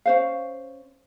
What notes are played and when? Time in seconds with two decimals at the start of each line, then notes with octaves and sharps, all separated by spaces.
0.05 C#4 C5 F5